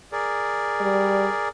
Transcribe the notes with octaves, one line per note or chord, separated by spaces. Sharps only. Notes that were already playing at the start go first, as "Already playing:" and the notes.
G#4 A#4 D5
G3